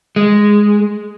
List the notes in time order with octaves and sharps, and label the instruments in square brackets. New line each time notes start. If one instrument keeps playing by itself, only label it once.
[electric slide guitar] G#3